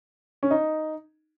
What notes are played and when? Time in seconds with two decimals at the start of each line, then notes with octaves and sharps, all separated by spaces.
0.43 C#4
0.51 D#4